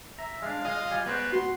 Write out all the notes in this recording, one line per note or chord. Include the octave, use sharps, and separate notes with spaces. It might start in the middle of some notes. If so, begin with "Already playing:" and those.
E5 A#5
G#3 D4 F5
G#3 F4 D#5
G3 G#5
G#3 B3 F#4 C5 D5
F#4 C6